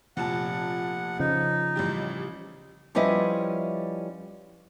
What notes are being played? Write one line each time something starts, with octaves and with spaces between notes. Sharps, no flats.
F1 A#2 F#5 A5
C#3 F3 D#4
A1 G3 G4
F3 G3 C#4 E4 B4 D#5